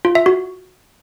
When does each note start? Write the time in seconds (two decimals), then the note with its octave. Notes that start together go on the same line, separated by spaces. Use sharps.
0.05 F4
0.15 E5
0.26 F#4